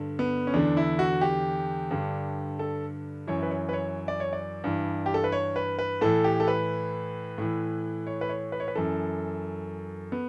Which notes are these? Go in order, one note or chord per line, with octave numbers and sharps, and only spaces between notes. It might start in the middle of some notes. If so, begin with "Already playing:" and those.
Already playing: G2 D3
B3
C#4
E2 D3 D4
E4
F#4
G4
G2 D3
A4
F#2 E3 C#5
B4
C#5
B4
C#5
D5
C#5
D5
G2 E3
G4
A4
B4
C#5
B4
B4
A2 E3 A4
G4
A4
B4
A2 E3
C#5
B4
C#5
B4
C#5
B4
F#2 E3 A4
B3